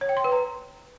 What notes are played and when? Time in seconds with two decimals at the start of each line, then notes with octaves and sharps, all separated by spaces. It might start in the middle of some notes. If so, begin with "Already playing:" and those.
0.01 C#5
0.09 G5
0.17 C6
0.24 B4
0.32 A#5